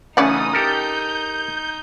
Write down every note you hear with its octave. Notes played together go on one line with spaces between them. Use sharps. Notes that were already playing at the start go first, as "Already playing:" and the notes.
C#3 E3 A3 C#4 D#4 D5 F#5 D#6
G4 A4 A#4 G6